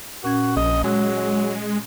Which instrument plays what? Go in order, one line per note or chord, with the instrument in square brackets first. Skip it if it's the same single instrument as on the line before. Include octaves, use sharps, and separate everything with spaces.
[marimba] A#2 C#4 G#6 [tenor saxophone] F#4
[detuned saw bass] A#1 [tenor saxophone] D#5
[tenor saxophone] F#3 [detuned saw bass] G#3